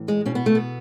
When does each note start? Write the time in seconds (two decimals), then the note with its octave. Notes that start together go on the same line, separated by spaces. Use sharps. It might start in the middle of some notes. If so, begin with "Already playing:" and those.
Already playing: A2 E3
0.08 G#3
0.26 B2 C#4
0.35 B3
0.46 A3
0.55 B3